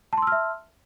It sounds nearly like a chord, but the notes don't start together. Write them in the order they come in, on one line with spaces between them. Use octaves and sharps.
A5 C6 E6 F6 E5